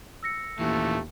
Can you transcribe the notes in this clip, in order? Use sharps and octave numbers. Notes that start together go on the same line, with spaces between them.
E6 A#6 C#7
D#2 A#2 E3 A3